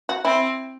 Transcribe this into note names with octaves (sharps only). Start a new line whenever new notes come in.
F#4
C4 E4